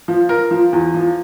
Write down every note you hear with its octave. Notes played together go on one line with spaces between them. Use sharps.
F3
A#4
F3
E2
F3